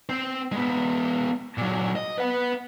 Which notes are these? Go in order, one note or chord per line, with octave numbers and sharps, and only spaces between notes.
C4 C5
G#3 B3
A#2 F#3
D#5
B4 F#5